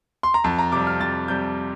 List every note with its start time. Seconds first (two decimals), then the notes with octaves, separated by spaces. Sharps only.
0.23 C6
0.34 A#5
0.44 F2 A5
0.59 A#5
0.72 C3 G3 D6
0.87 F6
1.01 F2 A6
1.28 C3 G3 G6